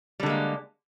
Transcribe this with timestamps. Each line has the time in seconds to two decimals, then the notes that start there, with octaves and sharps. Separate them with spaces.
0.20 G3
0.23 D3
0.26 G#3
0.30 A#3